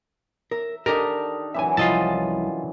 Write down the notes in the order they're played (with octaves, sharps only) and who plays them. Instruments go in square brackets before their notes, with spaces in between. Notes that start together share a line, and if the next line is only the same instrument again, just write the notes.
[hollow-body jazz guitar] A#4 [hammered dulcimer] E5
[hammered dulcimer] D#3 D4 D#4 [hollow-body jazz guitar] G4 A4 D#5 [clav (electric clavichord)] A#4
[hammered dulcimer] F#2 E3 F#3 [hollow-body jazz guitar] E5 G#5
[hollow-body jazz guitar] C2 F3 E4 [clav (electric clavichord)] F4 D#5 A5